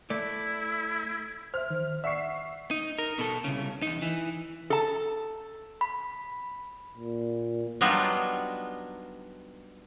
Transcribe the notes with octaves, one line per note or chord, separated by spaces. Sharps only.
A3 E4 D5
C5 E5 F6
D#3
D5 E5 F#5 C#6 C7
D#4
A#4
B2 A4
C2 C#3
E2 D#4
E3
A4 A5
B5
A#2
F#3 G3 B3 D4 D#4 F4